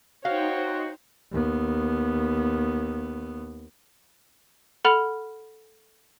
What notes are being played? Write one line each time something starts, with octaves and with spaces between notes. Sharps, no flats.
D#4 F#4 C5 C#5 F5 G5
D#2 B3
A4 F#5 B5 F6 F7